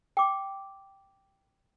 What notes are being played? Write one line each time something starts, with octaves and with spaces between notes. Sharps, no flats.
G5 D6